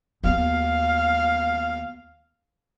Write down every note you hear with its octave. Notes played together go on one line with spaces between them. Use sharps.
D#2 B3 F5